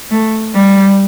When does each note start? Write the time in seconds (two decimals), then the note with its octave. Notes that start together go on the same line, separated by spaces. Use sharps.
0.11 A3
0.54 G3